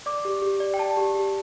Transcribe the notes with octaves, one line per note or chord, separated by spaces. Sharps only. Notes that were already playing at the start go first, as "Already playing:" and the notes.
D5 D6
G4
G4
D5
G5
D5 A5
G4
G4